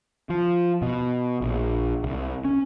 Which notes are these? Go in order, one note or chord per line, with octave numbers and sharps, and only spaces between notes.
F3
B2
A#1
C2
C#4